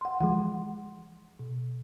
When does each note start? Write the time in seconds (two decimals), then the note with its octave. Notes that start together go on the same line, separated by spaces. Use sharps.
0.01 F#5 C6
0.21 E3 F3 G#3 F#5
1.39 B2